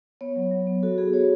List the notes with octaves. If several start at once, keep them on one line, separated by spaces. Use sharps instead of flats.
B3 C#5
F#3
F#3
B3
F#4 A4
B3 G#4
F#4 C#5